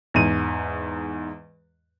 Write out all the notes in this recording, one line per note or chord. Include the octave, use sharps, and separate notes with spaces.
E2 G#2 D#7